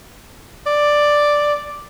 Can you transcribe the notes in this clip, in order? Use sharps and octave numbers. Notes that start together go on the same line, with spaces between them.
D5